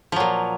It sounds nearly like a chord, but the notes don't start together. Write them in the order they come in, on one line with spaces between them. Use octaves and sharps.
F3 F#3 A#2